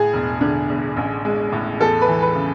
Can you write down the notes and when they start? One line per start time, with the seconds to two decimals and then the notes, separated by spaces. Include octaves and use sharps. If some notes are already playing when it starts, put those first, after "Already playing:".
Already playing: A2 G#4
0.13 E1
0.41 D3
0.69 E2
0.97 A1
1.25 G#3
1.52 A2
1.80 E2 A4
2.01 B4
2.08 E3
2.22 B4
2.35 C#3